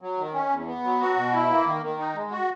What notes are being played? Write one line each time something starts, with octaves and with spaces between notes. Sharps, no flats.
F#3
D#3
C#4
E2
B3
F#3
F#4
B2
E4
A#3
D#3
D#3
D#4
G#3
F#4